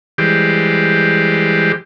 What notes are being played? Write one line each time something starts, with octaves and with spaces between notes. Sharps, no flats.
E3 G3 G#3 G4 C5